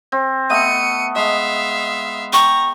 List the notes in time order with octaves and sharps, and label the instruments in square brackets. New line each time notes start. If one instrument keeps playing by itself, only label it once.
[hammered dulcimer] C4
[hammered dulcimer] A3 B3 D#5 [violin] C#7 D#7
[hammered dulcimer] G#3 [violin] E5 F5
[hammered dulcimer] G5 [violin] A#5 [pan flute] C#6